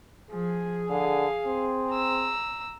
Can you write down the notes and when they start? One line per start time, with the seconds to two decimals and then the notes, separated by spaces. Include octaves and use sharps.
0.30 F3 G#4
0.90 D3 F5
1.46 C4
1.94 A#5 E6